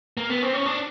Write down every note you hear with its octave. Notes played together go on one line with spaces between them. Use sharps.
A#3
B3
C4
C#4
D4